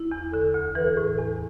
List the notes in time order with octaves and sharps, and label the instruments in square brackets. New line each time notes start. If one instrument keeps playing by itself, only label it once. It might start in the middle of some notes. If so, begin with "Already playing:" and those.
Already playing: [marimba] E4
E2
[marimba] D3 [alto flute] A4
[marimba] D2
[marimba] E3 [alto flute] B4
[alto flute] A4
[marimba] A2 [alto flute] G#4
[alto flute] A4
[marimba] E2